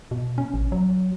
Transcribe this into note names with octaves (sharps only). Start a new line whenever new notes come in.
B2
C#4
A1
F#3